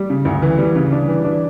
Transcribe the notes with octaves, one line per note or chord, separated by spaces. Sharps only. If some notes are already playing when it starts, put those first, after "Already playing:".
Already playing: G3
C#3
D2
E3
G3
C#3
D4
E3
D4